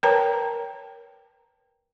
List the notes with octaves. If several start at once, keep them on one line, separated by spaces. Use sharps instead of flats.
A#4 B4 C#5 G5 A5 A#5